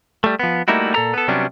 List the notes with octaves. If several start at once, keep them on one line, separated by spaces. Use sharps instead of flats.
G3 A3
F3 B3
G3 A3 A#3 D#4 E4 F#4
A#2 A4 A#5
B3 A4
C3 F#3 G3 B3 C#4 D4